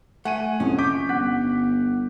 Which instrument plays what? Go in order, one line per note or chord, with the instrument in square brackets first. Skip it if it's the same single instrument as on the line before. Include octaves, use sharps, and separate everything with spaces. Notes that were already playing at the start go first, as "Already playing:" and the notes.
[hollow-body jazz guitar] A3 [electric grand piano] F#5 G#5 D#7
[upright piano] A#1 F2 C3 [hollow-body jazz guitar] C#4
[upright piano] C#6 G6 B6 [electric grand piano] D6
[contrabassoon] G1 [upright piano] F#5 F#6 B6